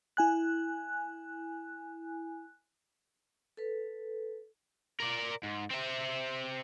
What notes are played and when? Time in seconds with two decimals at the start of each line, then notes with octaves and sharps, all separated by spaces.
0.17 E4 G#5 F#6
3.57 A4 B4
5.00 A#4 D5
5.43 G#2
5.70 C4 E5